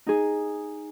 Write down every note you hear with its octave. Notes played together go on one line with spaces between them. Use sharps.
D#4 G#4